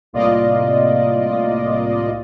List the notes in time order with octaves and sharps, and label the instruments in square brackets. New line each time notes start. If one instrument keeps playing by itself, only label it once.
[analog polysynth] C2 A2 A#3 F4 D5 D#5